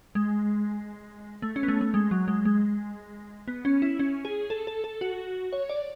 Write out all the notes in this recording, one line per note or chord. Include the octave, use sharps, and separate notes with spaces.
G#3
A3
C#4
B3
A3
A3
G#3
F#3
G#3
G#3
B3
C#4
E4
C#4
G#4
A4
A4
A4
F#4
C#5
D5